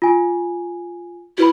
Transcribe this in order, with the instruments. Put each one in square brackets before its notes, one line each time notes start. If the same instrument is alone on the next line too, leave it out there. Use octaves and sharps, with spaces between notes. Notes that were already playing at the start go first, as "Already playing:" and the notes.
[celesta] F4 G#5
[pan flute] E4 [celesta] F#4 B4 B5